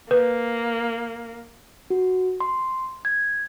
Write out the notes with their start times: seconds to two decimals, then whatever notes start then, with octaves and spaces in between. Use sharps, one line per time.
0.11 A#3 B4
1.90 F#4
2.40 C6
3.05 G#6